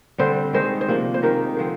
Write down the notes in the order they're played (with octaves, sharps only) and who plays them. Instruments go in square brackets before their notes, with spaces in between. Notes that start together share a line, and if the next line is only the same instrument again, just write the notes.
[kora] D3 G3 C4 G4 [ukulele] C5
[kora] D#3 G#3 D#4 [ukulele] C5
[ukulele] C5
[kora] C3 F3 A#3 D4
[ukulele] C5
[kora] D#3 G#3 D#4 G4 [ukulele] A#4
[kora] D3 F3 G#3 C4